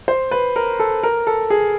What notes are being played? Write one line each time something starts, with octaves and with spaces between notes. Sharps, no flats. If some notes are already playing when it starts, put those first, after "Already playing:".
C5
B4
A#4
A4
A#4
A4
G#4